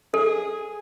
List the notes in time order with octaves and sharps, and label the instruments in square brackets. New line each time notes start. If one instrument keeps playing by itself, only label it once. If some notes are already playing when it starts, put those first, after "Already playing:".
[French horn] G#4 [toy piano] A4